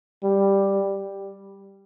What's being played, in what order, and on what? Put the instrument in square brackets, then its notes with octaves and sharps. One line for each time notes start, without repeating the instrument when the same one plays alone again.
[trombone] G3